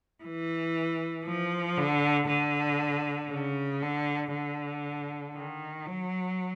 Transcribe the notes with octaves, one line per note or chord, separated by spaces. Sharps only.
E3
F3
D3
D3
C#3
D3
D3
D#3
F#3